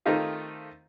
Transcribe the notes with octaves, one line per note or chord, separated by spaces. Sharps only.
D#3 A3 C4 D#4 F4 G4